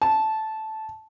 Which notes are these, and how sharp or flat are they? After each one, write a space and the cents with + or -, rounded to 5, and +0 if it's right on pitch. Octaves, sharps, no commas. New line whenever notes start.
A5 -10